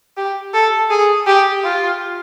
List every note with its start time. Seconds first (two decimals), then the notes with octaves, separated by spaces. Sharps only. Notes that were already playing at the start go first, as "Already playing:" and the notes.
0.17 G4
0.54 A4
0.90 G#4
1.27 G4
1.64 F4